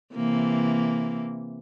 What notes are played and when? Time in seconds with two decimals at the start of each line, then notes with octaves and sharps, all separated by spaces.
0.15 C3 E3 A#3